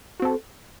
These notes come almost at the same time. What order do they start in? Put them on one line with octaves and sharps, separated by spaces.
F#4 C4 A4